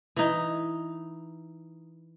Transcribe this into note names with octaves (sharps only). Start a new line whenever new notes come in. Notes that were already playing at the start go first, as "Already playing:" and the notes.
E3 D#4